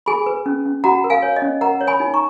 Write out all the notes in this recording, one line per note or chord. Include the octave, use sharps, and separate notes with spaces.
G#4 G#5 B5
B4
C#4
C#4
F#4 F#5 A#5
A#4
F5 G#5
C#5
D#5
C#4
A#4 F#5 A#5
C#5
G#5 B5
D#4
A#5 C#6